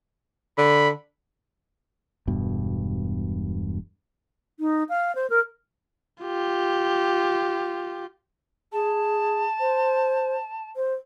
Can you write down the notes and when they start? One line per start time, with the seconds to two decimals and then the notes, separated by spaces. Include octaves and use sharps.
0.58 D3 B5
2.27 E1 G2 B2
4.58 D#4
4.89 F5
5.15 C5
5.30 A#4
6.22 F4 G4
8.73 G#4 A5
9.60 C5
10.76 C5